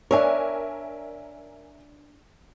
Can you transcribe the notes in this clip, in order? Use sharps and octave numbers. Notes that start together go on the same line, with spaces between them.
D4 A#4 C#5 E5 G#5